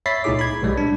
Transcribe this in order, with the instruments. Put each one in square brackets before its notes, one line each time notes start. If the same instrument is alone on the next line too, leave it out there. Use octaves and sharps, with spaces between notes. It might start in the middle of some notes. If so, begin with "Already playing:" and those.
[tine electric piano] C#5 E5 B5 A6 B6 C7
C#2 A#2 D#4 E4 G#4 D6
B5 G#6
B1 A2 G3 G#3
D4